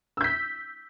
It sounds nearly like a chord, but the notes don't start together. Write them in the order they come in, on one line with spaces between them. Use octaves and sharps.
E6 G6 B6